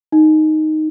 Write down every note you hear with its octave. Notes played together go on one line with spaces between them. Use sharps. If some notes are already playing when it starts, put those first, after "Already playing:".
D#4